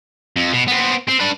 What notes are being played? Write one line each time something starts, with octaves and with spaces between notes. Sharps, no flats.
F2
B2
B3 C4
C4
D4 B4